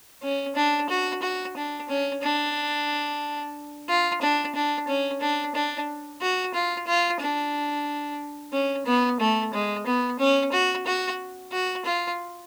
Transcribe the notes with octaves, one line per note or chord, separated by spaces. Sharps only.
C#4
D4
F#4
F#4
D4
C#4
D4
F4
D4
D4
C#4
D4
D4
F#4
F4
F4
D4
C#4
B3
A3
G#3
B3
C#4
F#4
F#4
F#4
F4